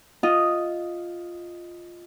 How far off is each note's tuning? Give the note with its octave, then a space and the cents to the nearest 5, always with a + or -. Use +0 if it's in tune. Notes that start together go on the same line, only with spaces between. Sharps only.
F4 +0 D#5 +0